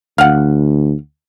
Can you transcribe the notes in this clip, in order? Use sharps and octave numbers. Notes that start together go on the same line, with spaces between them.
D2 F5 F#5